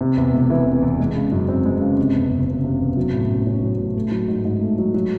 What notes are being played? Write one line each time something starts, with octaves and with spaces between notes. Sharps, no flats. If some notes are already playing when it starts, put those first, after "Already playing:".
C3
E2
E1
E3
C3
E2
G#3
C#3
F#2
C4
G#3
C#3
C3
E2
F#1
F#1
C3
E2
F#3
A2
A1
C#4
F#3
A2
A3
F#3
G#2
G#2
A3
F#3
F#3